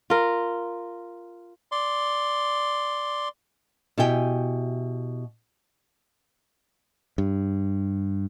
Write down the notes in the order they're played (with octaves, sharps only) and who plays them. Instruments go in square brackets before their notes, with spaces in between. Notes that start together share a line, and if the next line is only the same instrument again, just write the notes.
[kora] F4 A#4
[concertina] D5 C6
[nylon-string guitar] B2 E4 G4 G5 G#5
[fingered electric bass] G2